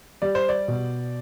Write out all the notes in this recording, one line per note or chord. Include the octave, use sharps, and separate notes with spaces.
G3 D5
C5
D5
B2